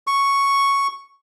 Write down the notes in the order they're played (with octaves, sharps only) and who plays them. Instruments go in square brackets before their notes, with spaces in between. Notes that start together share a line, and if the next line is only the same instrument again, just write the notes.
[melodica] C#6